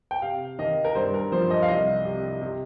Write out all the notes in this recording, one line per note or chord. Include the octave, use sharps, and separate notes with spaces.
G5
C3 F5
D#3 D#5
A#4
G2 C5
A#4
F3 C5
D#5
F5
C2 D#5
C3
C3